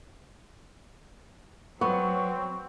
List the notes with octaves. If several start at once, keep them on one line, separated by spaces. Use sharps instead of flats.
F#3 B3 C4 C#6